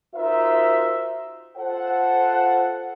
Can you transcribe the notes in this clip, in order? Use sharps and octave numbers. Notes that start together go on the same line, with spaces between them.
D#4 F4 F#4 A#4 C5 E5
F4 A4 C5 F#5